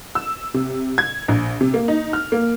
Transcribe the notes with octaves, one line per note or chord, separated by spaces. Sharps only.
E6
C3
G#6
A#1
C3
A#3
D#4
F6
A#3